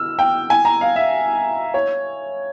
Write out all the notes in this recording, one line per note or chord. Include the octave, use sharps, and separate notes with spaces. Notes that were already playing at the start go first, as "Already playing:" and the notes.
Already playing: E6 F6
G5
G#5
A#5
F5
E5
C#5